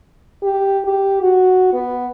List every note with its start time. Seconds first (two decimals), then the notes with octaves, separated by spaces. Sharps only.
0.42 G4
0.84 G4
1.22 F#4
1.73 B3